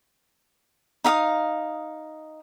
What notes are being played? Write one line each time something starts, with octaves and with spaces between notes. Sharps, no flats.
D#4 E5 F5 D#6